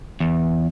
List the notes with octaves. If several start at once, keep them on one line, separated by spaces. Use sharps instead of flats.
E2